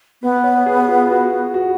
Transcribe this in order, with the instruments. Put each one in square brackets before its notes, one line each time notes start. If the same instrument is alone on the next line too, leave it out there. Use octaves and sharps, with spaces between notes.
[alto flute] B3 [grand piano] B4
[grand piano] C#5
G#4
F4
F#4
F#4